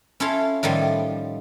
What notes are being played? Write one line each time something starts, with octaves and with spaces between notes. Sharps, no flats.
C#4 E4 F4 A4 F5 A5
A2 D#3 F3 G3